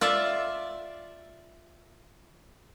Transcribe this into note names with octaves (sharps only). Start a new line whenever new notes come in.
F4 D5 E5